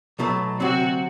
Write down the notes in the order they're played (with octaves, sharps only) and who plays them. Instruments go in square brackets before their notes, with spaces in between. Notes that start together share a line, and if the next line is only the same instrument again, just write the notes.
[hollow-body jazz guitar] B1 B2 F#3 A3
[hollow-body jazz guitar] D2 C3 F#3 C4 [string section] F#4